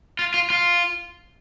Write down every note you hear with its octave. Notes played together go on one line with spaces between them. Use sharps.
F4
F4
F4